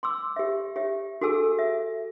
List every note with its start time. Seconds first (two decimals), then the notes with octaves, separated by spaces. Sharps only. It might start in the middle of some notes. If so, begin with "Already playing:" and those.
0.03 C6 D6 E6
0.36 G4 E5
0.76 G4 E5
1.21 F#4 G#4 A4 G#5 E6
1.59 E5